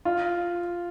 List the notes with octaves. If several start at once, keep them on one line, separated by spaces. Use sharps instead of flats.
F4